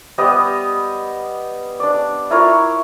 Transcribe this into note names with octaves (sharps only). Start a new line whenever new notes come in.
G3 B3 D#5 G5
D4 D5
E4 F4 A#4 C#5